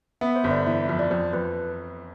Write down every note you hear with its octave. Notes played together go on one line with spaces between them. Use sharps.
B3 E5
C5
G1
D5
E3 E5
F2
D5
F2 C5
F2 B4